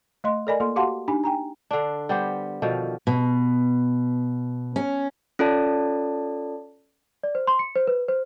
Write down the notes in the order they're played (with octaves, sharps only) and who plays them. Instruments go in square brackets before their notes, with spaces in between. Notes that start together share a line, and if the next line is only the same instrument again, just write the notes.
[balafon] A3 D#5 C6
A4 A#4 D5 D#5 G#5 B5
A#3 F4 A4 C6
F#4 G4 F5 F#5 A5 C6
D4 D#4 G4 G#5 B5
G5 G#5 A#5
[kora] D3 D4
G3 B3 G4 C5
B2 D3 D#3 F3
[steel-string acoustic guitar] B2
C#4
[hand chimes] C#4 F4 A4 D5 A5
[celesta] D5
C5
C6
C#7
C5
B4
C5